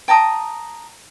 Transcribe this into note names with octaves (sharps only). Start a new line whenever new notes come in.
G5 A5 A#5 D#6